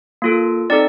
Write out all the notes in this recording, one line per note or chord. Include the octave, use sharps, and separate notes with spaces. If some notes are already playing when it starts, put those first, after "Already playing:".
A#3 F4 A4
C4 D#4 A4 D5